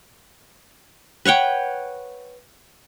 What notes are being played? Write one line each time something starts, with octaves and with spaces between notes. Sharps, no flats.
B4 C#5 F#5 G5